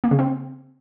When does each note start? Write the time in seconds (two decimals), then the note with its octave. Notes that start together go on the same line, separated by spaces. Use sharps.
0.04 A#3
0.11 C#3
0.19 C4